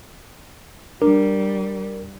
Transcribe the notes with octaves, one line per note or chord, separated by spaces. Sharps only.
G3 D4 A#4